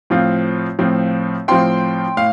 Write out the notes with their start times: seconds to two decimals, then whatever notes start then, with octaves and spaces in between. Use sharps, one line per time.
0.10 A2 F3 C4 F4
0.79 A2 F3 C4 F4
1.48 A2 F3 C4 F4 G5 C6
2.17 A2 F5